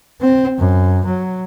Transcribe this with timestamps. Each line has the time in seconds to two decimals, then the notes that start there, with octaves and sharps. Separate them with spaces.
0.21 C4
0.58 F#2
1.05 F#3